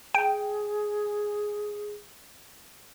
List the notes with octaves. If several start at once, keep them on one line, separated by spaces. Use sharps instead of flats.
G#4 G5